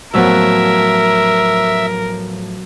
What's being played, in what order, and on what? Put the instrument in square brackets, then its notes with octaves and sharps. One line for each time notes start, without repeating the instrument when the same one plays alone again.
[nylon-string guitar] A2 F3 C#5 [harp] F#3 B3 F#4 [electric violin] A#4 [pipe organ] E5